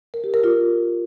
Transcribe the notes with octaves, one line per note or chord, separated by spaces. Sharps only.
A#4
G4
A#4
F4